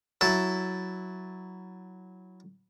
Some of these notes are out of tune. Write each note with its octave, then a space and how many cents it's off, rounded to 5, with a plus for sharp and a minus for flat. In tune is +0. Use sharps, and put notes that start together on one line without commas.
F#3 +0 E4 +0 A4 +0